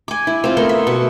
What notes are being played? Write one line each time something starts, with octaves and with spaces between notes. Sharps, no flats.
G#5 D6
E4
C4 F4
A3 B3 A#4 C6
E5
B2